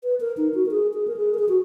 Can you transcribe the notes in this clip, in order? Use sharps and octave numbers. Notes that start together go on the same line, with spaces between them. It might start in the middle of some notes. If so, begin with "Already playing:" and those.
B4
A#4
D#4
F#4
A#4
G#4
G#4
A#4
G#4
A#4
G#4
F#4